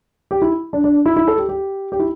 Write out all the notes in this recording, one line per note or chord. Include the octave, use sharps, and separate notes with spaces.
G4
E4
D4
D4
E4
E4
A4
G4
G4
G4
E4